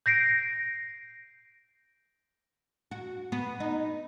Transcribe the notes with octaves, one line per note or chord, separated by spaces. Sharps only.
G6 A#6 C7 D7
F#4
B3
D#4